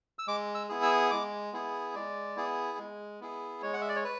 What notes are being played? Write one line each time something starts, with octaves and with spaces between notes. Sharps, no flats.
E6
G#3 D6
E6
B3 E4 G#4
E6
G#3 D6
B3 E4 G#4
G#3 D5
B3 E4 G#4
G#3
B3 E4 G#4
G#3 C#5
F#5
E5
D5
C#5
B4